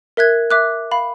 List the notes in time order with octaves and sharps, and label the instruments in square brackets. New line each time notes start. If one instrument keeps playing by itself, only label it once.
[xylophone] A#4 E5 F#6 G#6
E5 D6 F#6
F5 B5